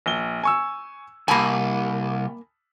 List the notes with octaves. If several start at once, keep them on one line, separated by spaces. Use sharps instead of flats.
A#1 G7
G#5 C#6 E6
C2 A#3 G#5 A5 B5